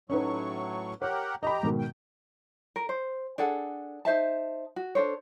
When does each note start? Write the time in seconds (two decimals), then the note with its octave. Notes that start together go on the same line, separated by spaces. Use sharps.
0.10 A2 F#3 C#4 D#4 B4 C#6
1.02 G4 A#4 C#5 F#5
1.43 G4 D#5 A#5 B5
1.63 G#2 B2 D#3
1.79 G5
2.76 A#4
2.89 C5
3.38 D4 G#4 A4 F#5
4.05 D#4 C5 E5 A5
4.76 F#4
4.95 D4 A4 C5 C#5